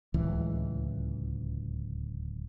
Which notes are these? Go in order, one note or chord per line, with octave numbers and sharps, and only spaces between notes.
D1 C#2 E3